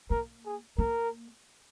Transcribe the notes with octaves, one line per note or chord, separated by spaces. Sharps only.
A#3 A#4
G#4
A#3 A#4